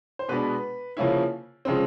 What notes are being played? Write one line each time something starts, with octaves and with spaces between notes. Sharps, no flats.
C5
B2 G#3 B3 D4 B4
C#3 F3 A#3 C#4 E4
C#3 F3 G#3 C4